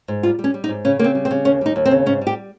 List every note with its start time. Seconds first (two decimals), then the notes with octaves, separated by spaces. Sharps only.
0.08 G#2
0.23 G3 F4
0.39 G3
0.44 C#4
0.54 G3
0.64 D#4
0.69 G#2
0.85 C#3 C#4
0.99 C#3 A#3 C4
1.15 G3
1.25 C4
1.31 C#3
1.45 D#2 C#4
1.61 G3 D#4
1.76 D#2
1.85 C4
1.91 C#3
2.06 G#2 C#4
2.21 G3
2.27 G4